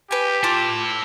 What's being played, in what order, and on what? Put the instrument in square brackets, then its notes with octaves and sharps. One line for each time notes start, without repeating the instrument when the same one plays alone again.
[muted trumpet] G4 [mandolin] B4 G#5
[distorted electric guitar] E4 A5 [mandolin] F4 D6